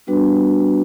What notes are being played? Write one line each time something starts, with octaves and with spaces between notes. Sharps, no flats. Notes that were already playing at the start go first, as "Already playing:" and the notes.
G3 B3 D4 F#4 B4